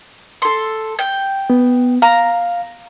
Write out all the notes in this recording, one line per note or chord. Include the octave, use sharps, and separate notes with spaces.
A4 C6
G5
B3
F5 A#5